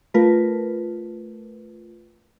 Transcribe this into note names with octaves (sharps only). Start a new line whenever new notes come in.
A3 F4 A#4 B4